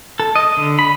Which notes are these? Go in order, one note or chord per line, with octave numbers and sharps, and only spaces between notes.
A4
D#5
D3
B5